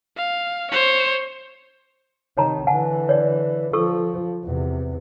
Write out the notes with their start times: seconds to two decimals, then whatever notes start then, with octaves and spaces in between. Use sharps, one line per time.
0.17 F5
0.71 C5 C#5
2.37 C3 D#3 C#5 A5 A#5
2.67 D3 E3 F#5 G#5 A5
3.09 C#5 D5
3.73 F3 A4 C#6 E6
4.45 E2 C3